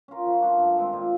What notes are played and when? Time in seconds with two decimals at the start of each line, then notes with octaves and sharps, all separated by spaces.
0.08 C#4 F4 A#4
0.25 F3
0.42 A3 D4 F4
0.58 G2
0.76 D#3 G#3 C4
0.93 A#2